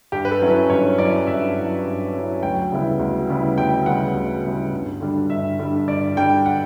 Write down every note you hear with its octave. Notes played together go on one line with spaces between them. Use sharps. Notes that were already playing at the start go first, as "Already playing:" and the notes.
G2 G4
B4
A4
F#3 C#4 E4
B4
G2 C#5
F#3 C#4 E4 D5
G2 E5
F#3 C#4 E4
G2
F#3 C#4 E4
D2 G5
C#3 G3 B3 E4
D2
C#3 G3 B3 E4
D2 G5
C#3 G3 B3 E4 F#5
D2
C#3 G3 B3 E4
G2
D3 G3 D4
G2 E5
D3 G3 D4
G2 D5
D3 G3 D4 G5
F#5